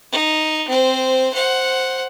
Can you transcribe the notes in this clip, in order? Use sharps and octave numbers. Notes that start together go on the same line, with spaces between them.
D#4
C4 C5
C5 F#5